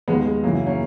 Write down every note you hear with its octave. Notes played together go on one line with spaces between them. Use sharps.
D#2 D#3 G#3 B3
G#3
F#2 C#3 E3 A#3
A#3
A#3 C#4